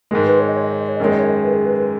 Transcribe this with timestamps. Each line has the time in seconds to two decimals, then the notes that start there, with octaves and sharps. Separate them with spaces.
0.11 G#2 D#3 G#3 A#4
0.27 B4
0.40 C#5
0.49 D#5
0.57 C#5
0.64 D#5
0.73 C#5
0.81 D#5
0.88 C#5
0.97 D#5
1.00 F#2 D#3 G#3 C#5
1.12 D#5
1.19 C#5
1.28 D#5
1.36 C#5
1.44 B4
1.54 G#4
1.66 B4
1.78 B4